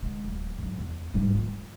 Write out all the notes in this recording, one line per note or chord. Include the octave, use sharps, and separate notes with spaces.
D3 G#3
D1
G#2 F#3
E2
G#2 G3
D#3 F4